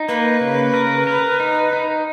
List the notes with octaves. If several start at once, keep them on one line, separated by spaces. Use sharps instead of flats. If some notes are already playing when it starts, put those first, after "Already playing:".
Already playing: D#4
A#3 B4
C#3
A#4
A#4
D#4
D#4